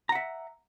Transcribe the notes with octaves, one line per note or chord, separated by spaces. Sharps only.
E5 F#5 A#5